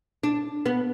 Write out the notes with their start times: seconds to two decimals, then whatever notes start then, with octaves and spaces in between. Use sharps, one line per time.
0.24 D4
0.66 B3